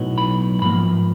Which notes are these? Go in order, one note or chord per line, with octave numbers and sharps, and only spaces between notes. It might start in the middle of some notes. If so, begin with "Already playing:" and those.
Already playing: B1 A2 F#3 B3 D#4
B5
G#2 F3 A#3 B5